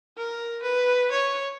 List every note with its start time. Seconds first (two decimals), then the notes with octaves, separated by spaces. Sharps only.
0.17 A#4
0.62 B4
1.11 C#5